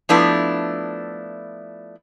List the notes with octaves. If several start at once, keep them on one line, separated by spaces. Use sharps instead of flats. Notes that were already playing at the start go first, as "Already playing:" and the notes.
F3 A3 B3 D4 E4